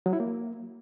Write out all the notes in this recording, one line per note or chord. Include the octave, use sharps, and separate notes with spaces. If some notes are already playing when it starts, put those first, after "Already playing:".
F#3
E4
A#3